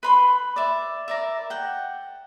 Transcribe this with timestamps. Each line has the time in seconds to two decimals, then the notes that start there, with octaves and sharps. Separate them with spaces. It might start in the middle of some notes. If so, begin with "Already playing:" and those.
0.03 B4 B5 C6
0.56 D5 E5
1.08 A#4 D5 E5
1.50 F#5 G5